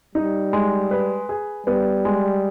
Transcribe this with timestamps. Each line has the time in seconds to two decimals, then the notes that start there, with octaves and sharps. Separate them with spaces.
0.15 G3 D#4
0.53 G#3
0.91 B4
1.29 G#4
1.67 G3 B3
2.05 G#3